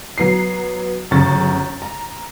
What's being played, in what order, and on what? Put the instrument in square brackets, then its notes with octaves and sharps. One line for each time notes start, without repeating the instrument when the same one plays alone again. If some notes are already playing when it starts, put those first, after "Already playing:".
[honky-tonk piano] F#3 B3 A#5 C7
G1 F#2 C#3 C#6 A6
A#5